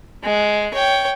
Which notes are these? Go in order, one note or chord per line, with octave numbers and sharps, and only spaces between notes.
G#3
C#5 G5